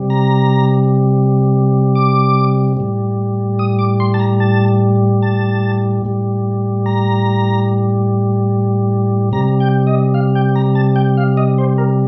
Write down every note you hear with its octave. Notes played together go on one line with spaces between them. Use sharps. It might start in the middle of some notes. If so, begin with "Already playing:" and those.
Already playing: C3 G3
A#5
D6
A2 G3
D#6
D6
C6
A5
A#5
A5
A5
A2 G3
A#5
C3 G3 A#5
G5
D#5
F5
G5
A#5
A5
G5
F5
D#5
C5
A#4